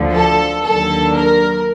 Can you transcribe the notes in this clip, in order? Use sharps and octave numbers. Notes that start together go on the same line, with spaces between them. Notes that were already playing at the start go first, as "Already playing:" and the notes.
Already playing: D2 D3 F3
A4
D#2 D3 F#3 A4
A#4